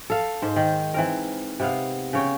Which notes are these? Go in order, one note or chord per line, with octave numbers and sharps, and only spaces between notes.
A4 F5
G#2 C5
D#3
E3 C4 A#4
C3 B3 F5
C#3 C#5 G5